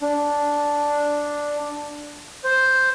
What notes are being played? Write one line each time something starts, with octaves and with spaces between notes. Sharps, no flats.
D4
C5